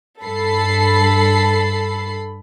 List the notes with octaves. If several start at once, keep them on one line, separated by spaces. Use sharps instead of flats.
G2 A4 B5 C7